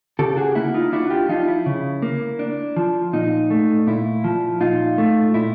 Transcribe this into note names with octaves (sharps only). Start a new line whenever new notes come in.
C#3 G4 A4
F#4 G#4
G4
A#3 E4 F#4
D#4 F4
D4 E4 F#4
F4 G4
F3 D#4 F4
E4
C#3
A#3
D4
F3
A#2 D#4
A3
A#2 E4
F3
A#2 D#4 F4
A3
A#2 E4